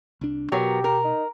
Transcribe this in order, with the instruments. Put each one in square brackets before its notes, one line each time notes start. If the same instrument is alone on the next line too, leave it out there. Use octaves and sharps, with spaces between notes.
[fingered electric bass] C2 D4
[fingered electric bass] B2 [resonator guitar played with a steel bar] F#3 B3 A#4 [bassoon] G4
[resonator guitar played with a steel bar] A#4
[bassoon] D#4